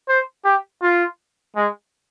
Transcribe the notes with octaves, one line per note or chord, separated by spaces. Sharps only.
C5
G4
F4
G#3